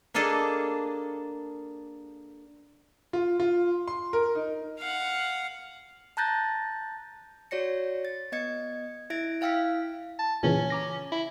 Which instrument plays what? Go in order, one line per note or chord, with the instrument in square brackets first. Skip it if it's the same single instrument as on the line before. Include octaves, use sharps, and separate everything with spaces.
[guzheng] A#3 D4 G#4 A4 D#5
[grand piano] F4
F4
C6
A#4
D#4
[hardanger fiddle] F5 F#5
[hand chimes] A5 A#5 F#6 G6 A6 A#6
F#4 C#5 D5 A#6 C#7
A6
B3 D#5 G#6 C#7
E4 E5 G#6 A#6 D7
E4 F5 G5 E6 F6 B6
[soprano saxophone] A5
[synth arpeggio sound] A#2 C#3 E3 [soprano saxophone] C#4
[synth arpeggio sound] A#5 D6 A#6
[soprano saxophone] E4